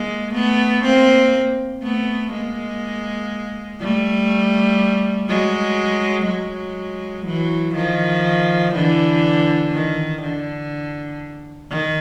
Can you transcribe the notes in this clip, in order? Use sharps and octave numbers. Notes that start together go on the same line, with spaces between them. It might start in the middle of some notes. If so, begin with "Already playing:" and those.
Already playing: G#3 A#3
A3 B3
A#3 C4
A3 B3
G#3 A#3
G3 A3
F#3 G#3
F#3 G#3
E3 F#3
D#3 F3
D3 E3
D#3
D3
D#3